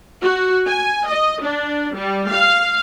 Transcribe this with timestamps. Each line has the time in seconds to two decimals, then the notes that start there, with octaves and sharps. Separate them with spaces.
0.22 F#4
0.68 G#5
1.07 D#5
1.43 D4
1.96 G3
2.31 F5